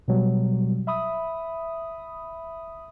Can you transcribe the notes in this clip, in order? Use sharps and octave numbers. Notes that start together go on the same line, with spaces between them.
B2 F#3 G3
E5 B5 D#6